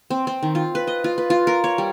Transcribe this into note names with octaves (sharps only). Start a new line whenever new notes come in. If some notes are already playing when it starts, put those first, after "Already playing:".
C4
C4
D#3
F4
B4
D#5
F4
B4
F4
A#4
C#5
G3